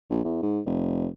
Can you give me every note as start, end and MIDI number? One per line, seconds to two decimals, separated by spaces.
0.10 0.21 34
0.24 0.41 40
0.42 0.60 44
0.66 1.08 29